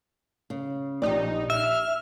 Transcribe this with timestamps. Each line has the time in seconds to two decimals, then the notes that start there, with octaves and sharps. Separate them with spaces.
0.50 C#3
1.02 A#1 D#4 G4 D5
1.50 E5 F6